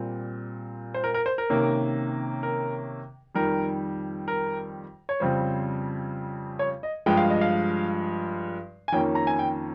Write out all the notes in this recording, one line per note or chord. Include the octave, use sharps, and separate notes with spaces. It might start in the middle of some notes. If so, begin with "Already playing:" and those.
Already playing: A#2 G3 C4
C5
A#4
A#4
C5
A#4
C3 D#3 A#3 C#4
A#4
F2 D#3 G3 A#4
A#4
C#5
F2 C#3 G3 C4 C5
C#5
D#5
G2 F3 G#3 G5
F5
D#5
F5
G#5
F2 D#3 A#3 C#4 G5
A#5
G#5
G5